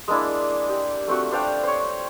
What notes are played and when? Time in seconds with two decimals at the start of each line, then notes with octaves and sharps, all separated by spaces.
0.08 G#3 A#3 D4 E4
0.69 G4
1.08 A3 C4 F4 F#4
1.31 D4 C5 F5 G5
1.63 C5 C#5